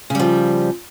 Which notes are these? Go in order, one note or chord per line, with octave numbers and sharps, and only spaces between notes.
C#3 F3 G3